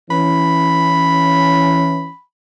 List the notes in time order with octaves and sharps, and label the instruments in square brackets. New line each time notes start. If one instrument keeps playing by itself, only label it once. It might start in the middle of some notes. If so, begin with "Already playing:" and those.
[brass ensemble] E3 C#4 [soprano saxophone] B5